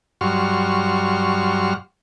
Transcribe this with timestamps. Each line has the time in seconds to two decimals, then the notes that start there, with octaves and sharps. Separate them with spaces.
0.21 G2 F#3 C6 C#6 F6